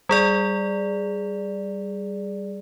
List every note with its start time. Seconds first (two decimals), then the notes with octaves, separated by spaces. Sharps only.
0.09 G3 G#4 D5